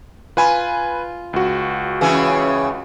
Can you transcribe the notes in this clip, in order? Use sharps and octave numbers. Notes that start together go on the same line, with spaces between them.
F4 B4 G#5 B5
C#2 F#4
C#3 E3 C#4